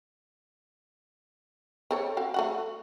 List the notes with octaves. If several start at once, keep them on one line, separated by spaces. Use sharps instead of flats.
C4 A4 C#5
F#4 F5 G5
A3 F#4 F#5